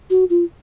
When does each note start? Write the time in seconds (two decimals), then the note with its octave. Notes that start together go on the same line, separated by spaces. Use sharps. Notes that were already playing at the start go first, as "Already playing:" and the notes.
0.10 F#4
0.30 F4